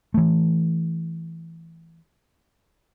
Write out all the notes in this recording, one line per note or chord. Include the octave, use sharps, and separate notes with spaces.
E3 A3